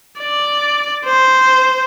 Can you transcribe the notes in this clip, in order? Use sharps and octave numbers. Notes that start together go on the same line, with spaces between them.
D5
C5